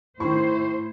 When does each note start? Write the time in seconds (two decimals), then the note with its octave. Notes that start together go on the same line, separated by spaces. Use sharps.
0.20 A2 D#3 E4 C5 C6 C#6